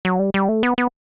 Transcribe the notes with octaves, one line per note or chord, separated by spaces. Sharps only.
F#3
G3
G3
A3
B3
B3